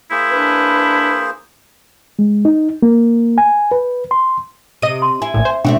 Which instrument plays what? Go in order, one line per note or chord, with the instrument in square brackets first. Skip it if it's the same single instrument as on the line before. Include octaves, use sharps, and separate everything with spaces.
[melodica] A#3 G#4 C5 [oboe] E4
[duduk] D4 [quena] B4
[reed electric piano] G#3
D#4
A#3
G#5
B4
C6
[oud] C3 [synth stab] D#5 D#7
[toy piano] C6
[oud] E4 [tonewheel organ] G#5
[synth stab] A#1 A2
C5
[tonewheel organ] B2 D4 [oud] A3 C4 F#4 [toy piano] G5